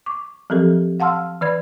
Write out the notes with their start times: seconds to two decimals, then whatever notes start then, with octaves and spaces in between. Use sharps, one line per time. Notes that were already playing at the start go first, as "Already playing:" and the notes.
0.06 C#6 D6
0.50 F3 F#3 C4 G4 A4 A#4
1.00 F5 F#5 A5 C6 E6 F6
1.41 E3 B4 D5 B5 G#6